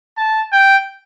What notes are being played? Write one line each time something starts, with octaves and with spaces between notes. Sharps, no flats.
A5
G5